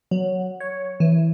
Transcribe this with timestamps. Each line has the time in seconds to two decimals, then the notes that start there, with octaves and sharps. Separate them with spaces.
0.11 F#3
0.60 C#5
1.00 E3